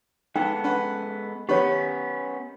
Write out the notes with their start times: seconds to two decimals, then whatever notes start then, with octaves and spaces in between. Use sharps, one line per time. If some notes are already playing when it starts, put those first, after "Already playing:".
0.36 G#3 B3 D#4 A4 F#5 G5
0.64 C#4 B4 F#5
1.49 D#3 B3 C#4 G4 B4 C#5